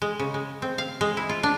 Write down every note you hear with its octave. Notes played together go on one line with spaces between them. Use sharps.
G#3
C#3
G#3
C4
F5
G#3
E4
F4
D4